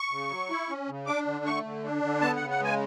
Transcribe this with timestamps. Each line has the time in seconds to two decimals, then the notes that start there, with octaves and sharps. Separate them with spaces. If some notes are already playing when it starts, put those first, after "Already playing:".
Already playing: C#6
0.11 C#3
0.30 F#3
0.50 E4
0.69 C#4
0.89 C#3
1.06 D4 D6
1.26 D3
1.45 A3 C#6
1.64 D3
1.84 D4
2.03 D3
2.21 B3 A5
2.36 C#3 F#5
2.51 F#5
2.60 G#3 G#5